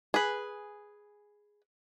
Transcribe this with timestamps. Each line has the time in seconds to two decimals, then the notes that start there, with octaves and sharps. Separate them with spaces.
0.14 G#4 B4